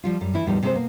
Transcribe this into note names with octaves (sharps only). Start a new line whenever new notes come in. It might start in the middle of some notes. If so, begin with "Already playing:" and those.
F3 G3 F4
F#2 G3
E3 E4
E2 A2 D#3 F3 G3 D#4
C3 G#3 C4 A4 C5
B2 A#3